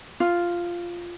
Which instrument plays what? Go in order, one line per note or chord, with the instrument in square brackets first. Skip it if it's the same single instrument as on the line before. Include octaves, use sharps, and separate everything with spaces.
[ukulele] F4